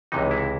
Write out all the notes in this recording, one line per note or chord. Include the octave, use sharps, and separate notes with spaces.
C#2 C3 E3 D#4
E4